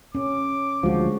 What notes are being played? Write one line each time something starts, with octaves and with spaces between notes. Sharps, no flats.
C#4 D6
D2 F3 G#3 F#4